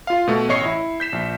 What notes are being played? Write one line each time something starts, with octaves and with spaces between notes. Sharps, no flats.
F4 F5
B2 A3
A1 C#5 D#5 C#6 C7 C#7
E4
G6 B6 E7
A#1